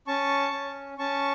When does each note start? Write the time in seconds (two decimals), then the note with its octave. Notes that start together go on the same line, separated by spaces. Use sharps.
0.07 C#4 A5 C#6
0.53 C#4
0.98 C#4 A5 C#6